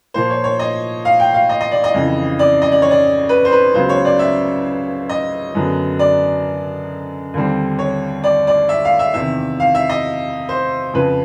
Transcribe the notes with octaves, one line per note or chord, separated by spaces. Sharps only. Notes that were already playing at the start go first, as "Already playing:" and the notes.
A#2 F3 A#3 C5
C#5
C#5
D#5
F5
G5
F5
D#5
D#5
D5
D#5
F2 C#3 E3
D5
D#5
D5
C#5
D5
B4
C5
B4
C#2 C#3 F#3 B3 C5
C#5
D5
E5
D#5
F#2 D3 F#3 B3
D5
D#2 D3 G3 C4
C#5
D5
D5
E5
F5
E5
E2 C3 D#3 E5
F5
E5
D#5
C5
F2 C#3 F3 B4